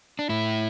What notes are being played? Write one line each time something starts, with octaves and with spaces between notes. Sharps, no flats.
D4
A2 E4